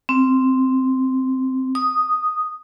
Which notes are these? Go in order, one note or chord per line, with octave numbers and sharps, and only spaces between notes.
C4
D#6